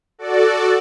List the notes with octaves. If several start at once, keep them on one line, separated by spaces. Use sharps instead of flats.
F#4 A4 D5